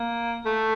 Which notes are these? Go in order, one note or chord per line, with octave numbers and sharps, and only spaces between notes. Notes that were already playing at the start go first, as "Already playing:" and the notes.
Already playing: A#3
A3